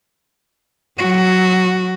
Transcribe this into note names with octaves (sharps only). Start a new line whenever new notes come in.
F#3 F#4